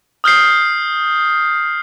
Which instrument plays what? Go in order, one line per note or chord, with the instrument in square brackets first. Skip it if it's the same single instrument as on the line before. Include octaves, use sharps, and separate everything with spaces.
[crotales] D#6 F6 G6 C7